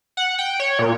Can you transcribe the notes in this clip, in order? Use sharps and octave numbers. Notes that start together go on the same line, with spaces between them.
F#5
G5
C#5
A#2